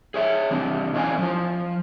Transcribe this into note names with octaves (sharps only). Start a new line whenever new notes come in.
G#4 C#5 E5
E3 C4 D4
E3 C#4 D#5 F5 G#5
F3 F4